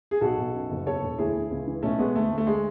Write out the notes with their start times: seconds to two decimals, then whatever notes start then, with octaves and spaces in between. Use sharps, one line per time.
0.11 G#4
0.21 B1 F#4 A4
0.38 B1
0.54 F#2
0.70 F#1
0.85 E2 A4 C#5
1.03 E1
1.18 D2 E4 G#4
1.35 D2
1.51 C#2
1.67 E3
1.83 B1 A3 C#4
1.99 B2 G#3 B3
2.15 D2 A3
2.31 D2
2.38 A3
2.47 G#3